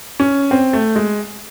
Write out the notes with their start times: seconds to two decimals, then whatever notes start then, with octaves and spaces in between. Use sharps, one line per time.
0.20 C#4
0.51 C4
0.73 A3
0.96 G#3